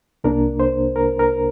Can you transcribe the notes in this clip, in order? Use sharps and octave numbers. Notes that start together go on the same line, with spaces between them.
C2 C3 A#3 D4 A#4
C5
A#4
A#4